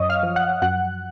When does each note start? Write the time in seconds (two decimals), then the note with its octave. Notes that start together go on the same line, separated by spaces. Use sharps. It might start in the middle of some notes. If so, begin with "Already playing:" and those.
Already playing: F#2 C#5 D#5 C#6 D#6
0.09 F5 F6
0.23 F3
0.36 F#5 F#6
0.62 F#2 F#5 F#6